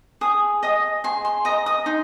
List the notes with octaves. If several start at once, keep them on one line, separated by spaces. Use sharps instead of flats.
G#4 D#6
D#5 D#6
G#4 C6
C6
D#5 A#5
D#6
D#4 C6